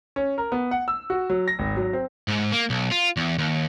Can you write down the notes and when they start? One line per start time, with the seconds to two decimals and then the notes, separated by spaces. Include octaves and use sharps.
0.16 C#4
0.38 A#4
0.52 B3
0.71 F#5
0.88 E6
1.10 F#4
1.30 F#3
1.48 A#6
1.59 G#1
1.77 F#3
1.93 C4
2.28 G#2
2.52 A#3
2.70 B1
2.92 F4
3.17 E2
3.38 D#2